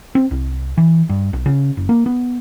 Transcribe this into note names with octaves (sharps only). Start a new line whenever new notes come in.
C4
C2
E3
G2
B1
C#3
F#1
A#3
B3